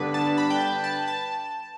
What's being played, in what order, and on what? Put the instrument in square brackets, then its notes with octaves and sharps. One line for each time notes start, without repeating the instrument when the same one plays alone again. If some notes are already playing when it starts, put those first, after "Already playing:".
Already playing: [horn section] G2 D3 G3 B3 D4 [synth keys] B4
[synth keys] A5
B5
G5
A5
A5
A5